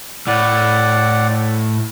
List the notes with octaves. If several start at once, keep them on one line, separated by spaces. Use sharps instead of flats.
A2 D5 F#5